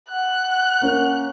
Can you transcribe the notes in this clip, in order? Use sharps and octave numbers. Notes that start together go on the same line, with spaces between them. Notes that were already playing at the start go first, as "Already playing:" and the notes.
F#5 F#6
A#3 C#4 A#4